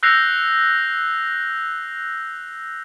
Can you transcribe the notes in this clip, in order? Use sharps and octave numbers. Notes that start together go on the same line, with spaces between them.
E6 F#6 G6 A#6 C7 F7